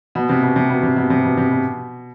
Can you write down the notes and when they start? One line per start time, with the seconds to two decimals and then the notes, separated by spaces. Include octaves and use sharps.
0.15 B2
0.29 C3
0.43 B2
0.56 C3
0.70 B2
0.83 C3
0.97 B2
1.10 C3
1.24 B2
1.37 C3
1.51 B2